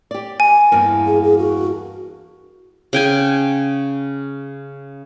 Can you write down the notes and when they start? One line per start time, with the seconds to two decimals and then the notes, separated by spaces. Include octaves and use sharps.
0.11 G4 D5
0.40 G#5
0.72 E2 G2 A#3
1.06 G#4
1.23 G#4
1.38 F#4
2.93 C#3 G5 G#5